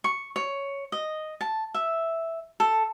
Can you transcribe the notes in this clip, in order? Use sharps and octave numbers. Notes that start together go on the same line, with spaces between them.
C#6
C#5
D#5
A5
E5
A4